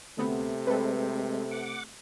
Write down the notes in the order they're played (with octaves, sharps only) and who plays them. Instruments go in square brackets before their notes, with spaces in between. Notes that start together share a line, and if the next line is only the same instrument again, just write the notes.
[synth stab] D2 B3 C4 [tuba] C3 [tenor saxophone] A3
[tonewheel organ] G#3 C4 [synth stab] A4 B4
[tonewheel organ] F#5 D6